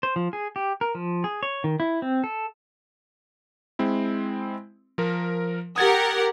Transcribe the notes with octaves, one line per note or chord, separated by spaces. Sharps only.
C5
F3
G#4
G4
A#4
F3
G#4
C#5
D#3
E4
C4
A4
G#3 C4 E4
F3 A#4
G4 A#4 F#5 D#6 G#6 A6